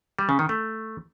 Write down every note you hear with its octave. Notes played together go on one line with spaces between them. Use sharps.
G3
C#3
D#3
A3